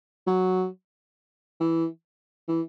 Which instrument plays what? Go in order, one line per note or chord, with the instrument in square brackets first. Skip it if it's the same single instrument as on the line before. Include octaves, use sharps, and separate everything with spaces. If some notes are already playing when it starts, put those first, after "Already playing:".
[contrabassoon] F#3
E3
E3